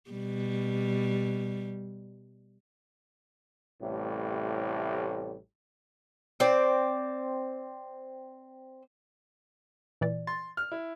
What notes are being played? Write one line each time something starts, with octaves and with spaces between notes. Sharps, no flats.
B2 G3
A1 A2 C3 G3
C4 D5
A#2 E3 D5
C6 A6
F6
E4